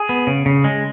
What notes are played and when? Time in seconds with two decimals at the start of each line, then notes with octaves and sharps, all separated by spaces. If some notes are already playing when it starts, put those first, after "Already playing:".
Already playing: G#4
0.09 B3
0.27 C#3
0.46 C#3
0.64 G#3